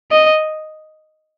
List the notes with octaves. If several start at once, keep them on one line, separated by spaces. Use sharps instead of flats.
D#5